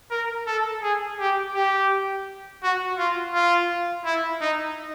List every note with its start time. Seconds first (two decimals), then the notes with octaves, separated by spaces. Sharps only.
0.11 A#4
0.47 A4
0.82 G#4
1.19 G4
1.55 G4
2.63 F#4
2.98 F4
3.34 F4
4.05 E4
4.41 D#4